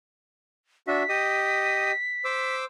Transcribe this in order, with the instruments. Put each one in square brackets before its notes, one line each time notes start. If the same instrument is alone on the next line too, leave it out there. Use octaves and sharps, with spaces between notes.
[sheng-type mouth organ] D4 F#4 E5 [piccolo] B6
[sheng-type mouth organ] G4 D#5 D#6
C5 D6 E6